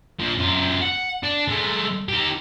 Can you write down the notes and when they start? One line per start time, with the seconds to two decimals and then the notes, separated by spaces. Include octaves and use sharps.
0.20 A#2 F3
0.38 F#2 F4
0.82 F#5
1.23 D4
1.48 G#3 A3
2.09 D#4 G4